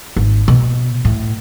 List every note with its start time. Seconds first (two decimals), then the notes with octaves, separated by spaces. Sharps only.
0.16 G#1
0.48 B2
1.05 A2